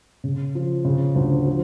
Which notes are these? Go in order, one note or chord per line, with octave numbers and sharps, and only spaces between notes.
C#3
F3
C#3
D2
F3